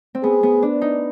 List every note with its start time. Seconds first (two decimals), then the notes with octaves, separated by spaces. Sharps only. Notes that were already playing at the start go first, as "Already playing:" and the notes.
0.15 C4
0.23 B3 G#4
0.43 B3
0.63 D4
0.82 D#4